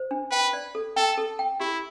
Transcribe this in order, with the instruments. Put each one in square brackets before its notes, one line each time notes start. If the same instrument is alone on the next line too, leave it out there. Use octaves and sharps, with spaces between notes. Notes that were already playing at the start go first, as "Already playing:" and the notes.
Already playing: [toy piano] C5
D4
[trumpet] B4 [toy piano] G5
[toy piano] D5
A4
[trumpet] A4 [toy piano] G5
[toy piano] A4
G5
[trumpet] E4 [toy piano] G4